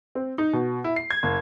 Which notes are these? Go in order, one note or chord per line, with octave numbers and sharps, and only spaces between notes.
C4
D#4
B2
E4
C7
G#6
F#1